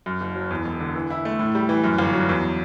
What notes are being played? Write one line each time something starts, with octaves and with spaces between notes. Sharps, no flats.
F#2
F#1
F#3
E2
E1
D3
E3
E4
A3
A2
G3
E3
F#2
G1
F#3
E2